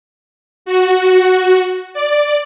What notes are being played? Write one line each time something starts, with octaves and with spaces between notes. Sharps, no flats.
F#4
D5